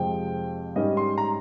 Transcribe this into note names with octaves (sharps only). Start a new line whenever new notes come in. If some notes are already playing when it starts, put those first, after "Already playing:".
Already playing: F2 C3 F3 G#3 C4 G5
G#2 G3 C#4 D#5
C6
A#5